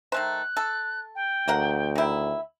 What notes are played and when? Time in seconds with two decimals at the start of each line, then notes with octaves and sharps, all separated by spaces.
0.12 D#3 A3 C5 F#6
0.57 A4
1.15 G5
1.48 D2 A#3 A#4 F#5
1.96 D#3 E4